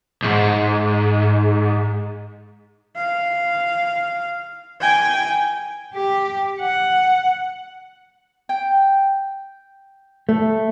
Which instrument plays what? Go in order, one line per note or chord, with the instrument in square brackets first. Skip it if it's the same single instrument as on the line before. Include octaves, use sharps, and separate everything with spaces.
[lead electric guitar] B1 G#2
[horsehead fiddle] F5
G5 G#5
[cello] G4
F#5
[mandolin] G5
[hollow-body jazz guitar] A3